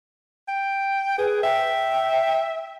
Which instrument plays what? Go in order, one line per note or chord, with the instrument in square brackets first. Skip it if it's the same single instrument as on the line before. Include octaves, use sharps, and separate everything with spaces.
[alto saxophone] G5
[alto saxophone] G#4 [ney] B4
[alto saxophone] E5 [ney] G5